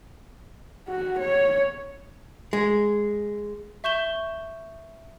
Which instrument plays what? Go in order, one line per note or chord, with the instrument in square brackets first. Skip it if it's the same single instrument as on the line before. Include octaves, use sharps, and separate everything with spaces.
[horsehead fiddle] F#4
C#5
[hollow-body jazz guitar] G#3
[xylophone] E5 C#6 G6 E7 G7